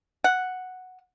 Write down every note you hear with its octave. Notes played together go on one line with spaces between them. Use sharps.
F#5